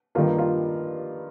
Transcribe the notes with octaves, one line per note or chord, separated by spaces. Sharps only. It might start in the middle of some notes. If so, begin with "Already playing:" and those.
G2 D#3 G3 A#3 F4
F4